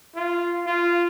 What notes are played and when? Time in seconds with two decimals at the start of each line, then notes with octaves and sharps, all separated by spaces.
0.15 F4
0.67 F4